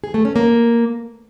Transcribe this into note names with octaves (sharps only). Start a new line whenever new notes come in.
G#4
A3
C#4
A#3